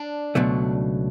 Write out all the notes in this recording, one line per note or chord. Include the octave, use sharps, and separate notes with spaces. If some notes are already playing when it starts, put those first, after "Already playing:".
Already playing: D4
C#2 B2 F#3 A3